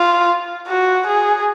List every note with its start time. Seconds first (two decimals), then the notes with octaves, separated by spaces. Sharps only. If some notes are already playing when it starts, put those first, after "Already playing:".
Already playing: F4
0.68 F#4
1.07 G#4